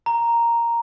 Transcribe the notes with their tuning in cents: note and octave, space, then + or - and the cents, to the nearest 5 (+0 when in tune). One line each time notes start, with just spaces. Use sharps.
A#5 +0